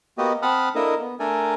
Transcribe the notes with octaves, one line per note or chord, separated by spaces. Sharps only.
A#3 B3 F#4 G4 D#5
C4 F#5 A5 B5 D#6 F6
A#3 D4 E4 A4 A#4 D#5
B3
A3 D4 A4 A#4 D5 G#5